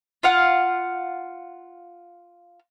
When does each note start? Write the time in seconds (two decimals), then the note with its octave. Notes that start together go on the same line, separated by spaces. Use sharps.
0.23 F4 F5 F#5